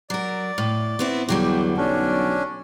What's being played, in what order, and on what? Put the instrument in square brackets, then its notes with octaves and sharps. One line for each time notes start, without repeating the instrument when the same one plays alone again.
[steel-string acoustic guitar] F#3 A#4 [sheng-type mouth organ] D5
[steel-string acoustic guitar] A2
B3 C4 E4
[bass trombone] E2 [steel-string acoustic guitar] D3 F#3 G3 [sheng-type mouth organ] G4
[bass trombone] B1 [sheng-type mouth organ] C#4 D4